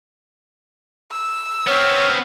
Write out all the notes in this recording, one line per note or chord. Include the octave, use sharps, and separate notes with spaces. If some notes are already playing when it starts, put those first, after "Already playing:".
E6
B3 C4 C#5 F6